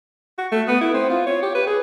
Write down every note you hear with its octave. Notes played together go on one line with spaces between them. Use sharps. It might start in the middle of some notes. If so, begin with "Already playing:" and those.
F#4
A3
B3
E4
C4
F4
C#5
G4
B4
G#4